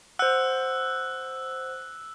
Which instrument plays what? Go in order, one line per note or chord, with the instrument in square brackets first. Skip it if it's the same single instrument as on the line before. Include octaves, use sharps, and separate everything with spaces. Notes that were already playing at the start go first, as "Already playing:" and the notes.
[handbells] C5 F#5 [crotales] E6 F#6